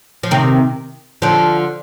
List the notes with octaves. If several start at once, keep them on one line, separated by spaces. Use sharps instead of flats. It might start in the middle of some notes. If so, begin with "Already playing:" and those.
F3
C3 D#3
D3 F3